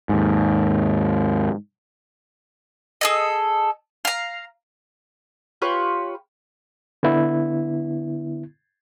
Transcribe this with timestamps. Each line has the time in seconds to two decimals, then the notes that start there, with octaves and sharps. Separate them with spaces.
0.09 D#2 G#2
3.01 G#4 A4 D#5
4.05 F5 A#5
5.62 F4 G4 B4 C#5
7.03 D3 B3 E4